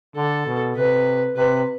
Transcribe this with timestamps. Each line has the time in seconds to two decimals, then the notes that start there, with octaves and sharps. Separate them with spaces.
0.16 D3 A4
0.47 B2
0.76 C3 B4
1.36 C3 B4